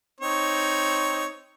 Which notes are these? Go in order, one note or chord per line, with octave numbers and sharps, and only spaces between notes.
C4 D#4 C#5